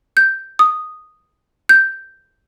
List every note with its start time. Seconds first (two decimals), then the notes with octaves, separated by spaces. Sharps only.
0.17 G6
0.59 D#6
1.69 G6